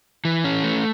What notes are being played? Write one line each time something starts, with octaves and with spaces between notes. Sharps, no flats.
E3
C#4
A3